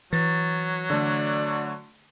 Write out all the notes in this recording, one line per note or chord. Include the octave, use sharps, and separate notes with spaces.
E3 F#3 A6 A#6
D3 A3 D5